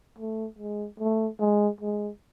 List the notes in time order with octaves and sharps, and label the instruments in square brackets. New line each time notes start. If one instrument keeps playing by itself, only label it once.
[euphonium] A3
G#3
A3
G#3
G#3